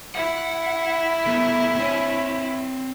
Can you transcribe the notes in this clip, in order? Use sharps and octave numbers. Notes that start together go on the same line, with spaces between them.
E4 F#5
A3 B3
C4 C#5